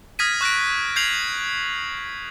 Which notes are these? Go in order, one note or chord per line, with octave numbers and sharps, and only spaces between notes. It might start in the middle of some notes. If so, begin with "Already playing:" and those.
D#6 F6 G#6 A#6 B6 D#7
C#6 F#6 A#6 D7
G6 G#6 C7 F7 F#7